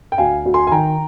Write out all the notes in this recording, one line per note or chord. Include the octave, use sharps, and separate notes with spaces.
G5
D2 F5 G#5
D2
G#5 C6
G#5
D#3 G5 A#5